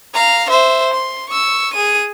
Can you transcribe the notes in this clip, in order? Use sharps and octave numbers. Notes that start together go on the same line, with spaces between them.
F5 A#5
C5 E5
C6
C#6 E6
G#4 D#7